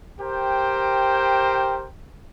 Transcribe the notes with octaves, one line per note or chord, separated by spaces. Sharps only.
G4 A#4 C5 G5